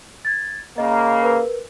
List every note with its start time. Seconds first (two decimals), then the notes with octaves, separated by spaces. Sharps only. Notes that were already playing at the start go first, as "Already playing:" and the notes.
0.25 G#6 A6
0.78 C#3 A#3 D#5
1.23 A#4 B4